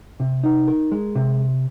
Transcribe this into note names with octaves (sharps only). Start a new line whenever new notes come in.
C3
D#4
A#4
G#3
C3